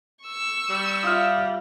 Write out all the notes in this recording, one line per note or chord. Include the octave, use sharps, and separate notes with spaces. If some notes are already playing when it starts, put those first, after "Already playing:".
C#6 E6
G3
F4 F#4 E5 D#6 F6